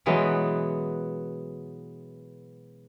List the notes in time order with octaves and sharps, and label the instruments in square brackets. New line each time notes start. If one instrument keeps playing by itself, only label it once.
[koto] B2 E3 F#3 G#3